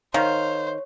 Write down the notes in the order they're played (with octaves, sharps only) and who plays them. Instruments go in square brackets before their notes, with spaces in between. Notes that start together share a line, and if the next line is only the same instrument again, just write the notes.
[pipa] D#3 [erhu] C5 [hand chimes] C#5 [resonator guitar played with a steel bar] F5